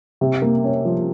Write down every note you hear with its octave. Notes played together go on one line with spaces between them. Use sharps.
C3
A#3
C#4
F3